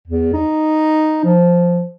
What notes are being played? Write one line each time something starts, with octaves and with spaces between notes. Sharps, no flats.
E2
D#4
F3